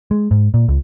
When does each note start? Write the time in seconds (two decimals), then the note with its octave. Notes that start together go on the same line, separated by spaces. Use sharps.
0.11 G#3
0.31 G#2
0.54 A#2
0.68 C#2